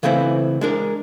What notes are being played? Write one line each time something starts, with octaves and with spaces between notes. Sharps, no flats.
C#3 E3 A3 C4 E4
G#3 D4 A#4